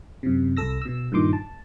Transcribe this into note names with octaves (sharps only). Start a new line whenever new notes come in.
F#2 C3
C2 A4 E6 A#6
B2 E6
G2 A#2 D#3 C6 D6
A5